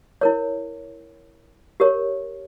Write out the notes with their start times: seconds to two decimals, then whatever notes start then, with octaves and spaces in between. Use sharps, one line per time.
0.21 E4 A#4 C#5
1.80 G4 A#4 C#5